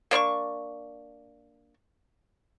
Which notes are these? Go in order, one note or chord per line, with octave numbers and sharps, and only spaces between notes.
A#3 D4 C6 C#6